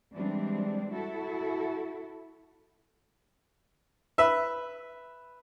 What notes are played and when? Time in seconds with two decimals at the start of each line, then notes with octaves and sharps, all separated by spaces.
0.15 E3 G3 G#3 C4 D4
0.93 E4 F#4 A4
4.18 B4 E5